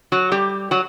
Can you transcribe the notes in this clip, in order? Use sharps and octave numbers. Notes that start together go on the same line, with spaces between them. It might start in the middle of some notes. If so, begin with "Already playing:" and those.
F#3 F#4
G3 G4
F#3 F#4